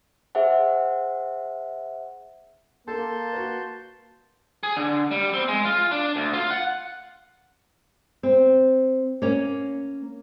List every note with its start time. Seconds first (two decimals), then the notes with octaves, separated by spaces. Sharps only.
0.35 G#4 C5 E5 F#5
2.88 A#3 A4 A5 C6 G6
3.33 F#4 B4
4.63 G#4
4.76 D3
5.11 G3
5.34 C4
5.48 G#3
5.65 F4
5.92 D4
6.16 D2
6.33 F4
6.50 F#5
8.23 C4
9.22 A#3 C#4